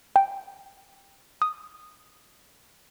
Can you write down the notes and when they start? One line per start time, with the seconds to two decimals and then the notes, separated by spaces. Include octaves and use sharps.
0.16 G5
1.42 D#6